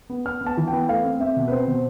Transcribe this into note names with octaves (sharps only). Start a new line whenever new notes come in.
B3
B3 F6
B3
A5
E3
G5
B3
A3 F5
C4
C4 E5
B2
B4
C4 C5
B2